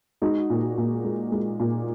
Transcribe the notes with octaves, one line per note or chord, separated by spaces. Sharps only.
G#3 D#4 F#4
A#2
A#2
G#3
G#3
A#2